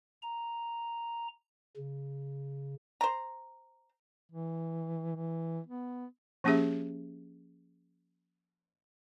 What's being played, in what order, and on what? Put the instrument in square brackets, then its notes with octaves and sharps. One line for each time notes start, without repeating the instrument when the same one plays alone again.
[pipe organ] A#5
C#3
[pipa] C5 A#5
[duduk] E3
E3
B3
[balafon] F3 A#3 C#4 G4 G#4 E5